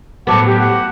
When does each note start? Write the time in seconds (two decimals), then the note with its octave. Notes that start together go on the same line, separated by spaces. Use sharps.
0.27 A2 F#3 B3 F#5 A5 D6
0.46 G4
0.58 F#5